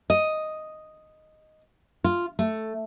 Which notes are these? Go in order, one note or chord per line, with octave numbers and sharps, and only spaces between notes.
D#5
F4
A3